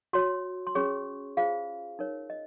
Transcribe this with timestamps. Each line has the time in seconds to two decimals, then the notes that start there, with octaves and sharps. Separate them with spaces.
0.13 F#4 C#5 C6
0.67 C6
0.75 C#4 G#4 C#5 C#6
1.37 F4 G#4 C5 F5
1.99 D#4 A#4 C#5
2.30 D#5